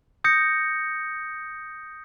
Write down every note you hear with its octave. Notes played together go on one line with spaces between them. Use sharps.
D#6 G6 A#6 C#7